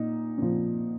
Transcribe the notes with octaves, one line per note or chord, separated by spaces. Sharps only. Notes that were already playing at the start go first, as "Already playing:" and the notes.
Already playing: A#2 D#4
A#2 F3